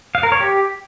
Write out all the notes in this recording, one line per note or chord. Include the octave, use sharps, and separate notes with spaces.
F5
A#4
C#5
G4